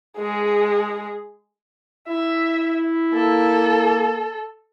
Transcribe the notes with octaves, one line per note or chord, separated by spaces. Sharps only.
G#3 G#4
E4 E5
A#3 A4